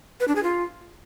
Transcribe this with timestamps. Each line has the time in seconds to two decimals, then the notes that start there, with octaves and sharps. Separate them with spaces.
0.20 B4
0.28 D4
0.36 G#4
0.43 F4